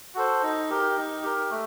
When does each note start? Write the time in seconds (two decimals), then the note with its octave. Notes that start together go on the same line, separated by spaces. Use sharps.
0.15 F#4 A4 C5
0.43 D#4
0.70 G4 A#4
0.97 D#4
1.23 G4 A#4
1.51 A3